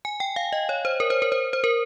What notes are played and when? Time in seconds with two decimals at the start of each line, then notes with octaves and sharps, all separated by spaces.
0.05 G#5
0.20 G5
0.36 F5
0.53 D#5
0.69 C#5
0.85 C5
1.00 A#4
1.10 C5
1.22 A#4
1.32 C5
1.53 C5
1.64 A#4